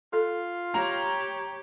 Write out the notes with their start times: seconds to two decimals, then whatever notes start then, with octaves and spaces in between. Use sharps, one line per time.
0.13 F4 A4
0.74 G4 C#5 A#5